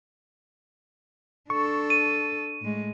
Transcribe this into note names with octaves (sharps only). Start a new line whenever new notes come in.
D4 A4 C#6
D#7
A2 G#3